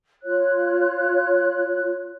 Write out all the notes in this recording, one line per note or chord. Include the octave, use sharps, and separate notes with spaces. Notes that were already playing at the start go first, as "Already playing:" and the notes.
F4 C#5 F#6